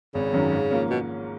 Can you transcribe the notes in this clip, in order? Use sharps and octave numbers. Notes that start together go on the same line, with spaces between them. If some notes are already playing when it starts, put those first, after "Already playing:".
G#1 C#3
F#2 D#3 F#3 C#4
G#2
F3 A#3 C#4
B2